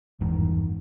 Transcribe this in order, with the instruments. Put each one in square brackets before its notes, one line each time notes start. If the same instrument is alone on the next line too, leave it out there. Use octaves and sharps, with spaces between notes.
[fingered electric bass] G1 E2 G#2 D#3